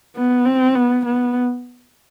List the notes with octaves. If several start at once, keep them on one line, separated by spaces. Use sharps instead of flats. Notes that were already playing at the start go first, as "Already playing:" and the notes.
B3
C4
B3
B3